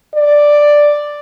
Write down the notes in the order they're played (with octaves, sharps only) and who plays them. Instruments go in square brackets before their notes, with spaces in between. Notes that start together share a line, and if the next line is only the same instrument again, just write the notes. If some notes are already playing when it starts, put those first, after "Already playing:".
[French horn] D5